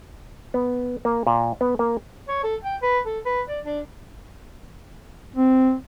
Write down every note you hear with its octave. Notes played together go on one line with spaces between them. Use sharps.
B3
A#3
A#2
B3
A#3
C#5
A4
G5
B4
A4
B4
D5
D4
C4